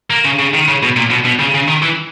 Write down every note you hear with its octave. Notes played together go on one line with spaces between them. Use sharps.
A#3
C#3
C#3
D#3
C#3
B2
A#2
B2
B2
C#3
C#3
D#3
E3